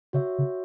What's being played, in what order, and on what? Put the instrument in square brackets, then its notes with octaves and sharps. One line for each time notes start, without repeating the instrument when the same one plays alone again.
[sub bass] C#3 [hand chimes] F#4 C#5 E5
[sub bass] C#3